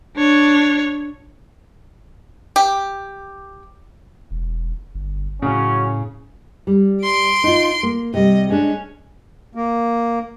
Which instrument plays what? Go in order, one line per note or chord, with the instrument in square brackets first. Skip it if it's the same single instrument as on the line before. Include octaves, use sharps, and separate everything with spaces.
[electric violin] D4 C#5
[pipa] G4
[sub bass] E1
G1
[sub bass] A2 [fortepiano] C#3 [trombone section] F#3 C#4
[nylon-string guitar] G3
[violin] C6 D7
[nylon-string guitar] D#4 F4
A#3
[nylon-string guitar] C3 G3 [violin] D#5
[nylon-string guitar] G#3 D4 [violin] C#4
[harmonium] A#3